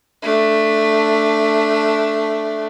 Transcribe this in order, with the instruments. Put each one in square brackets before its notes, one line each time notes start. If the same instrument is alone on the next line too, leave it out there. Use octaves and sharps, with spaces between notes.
[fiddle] A3 D4